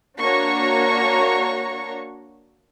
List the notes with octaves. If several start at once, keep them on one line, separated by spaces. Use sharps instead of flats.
A#3 D4 F#4 C#5 A#5 C#6